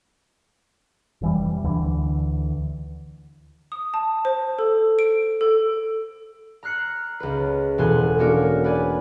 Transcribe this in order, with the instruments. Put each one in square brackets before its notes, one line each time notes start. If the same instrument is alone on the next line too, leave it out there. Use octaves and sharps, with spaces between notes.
[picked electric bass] F1 E3 G3
D2 D3 E3
[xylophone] D#6
A5
C5
A4
D7
A4
[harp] A#5 F6 F#6 C7 C#7
C#2 B4
E1 B2 A4 G#5 C6 F#6
A#3 C#4 D4 F#4 A#4
B4 D5 G#5